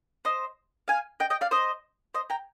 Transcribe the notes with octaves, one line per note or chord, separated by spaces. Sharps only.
C5 D#5
F5 G#5
D#5 G5
D#5 G5
D5 F5
C5 D#5
C5 D#5
G5 A#5